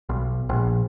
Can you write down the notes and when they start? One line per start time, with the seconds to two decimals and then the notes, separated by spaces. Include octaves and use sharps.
0.09 B1
0.49 A#1